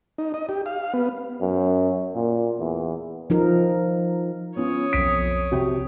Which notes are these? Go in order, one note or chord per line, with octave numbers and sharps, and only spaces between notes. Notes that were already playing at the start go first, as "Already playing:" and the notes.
D#4
D#5
G4
F5
B3
F#2
A#2
E2
F3 D#4 A#4
B3 C#4 F4 C#5 D#6
B1 F2 B6 D7
C3 F#4 G4 G5